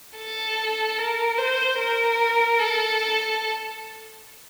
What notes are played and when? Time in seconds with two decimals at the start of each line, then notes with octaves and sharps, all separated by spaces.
0.16 A4
0.98 A#4
1.38 C5
1.79 A#4
2.59 A4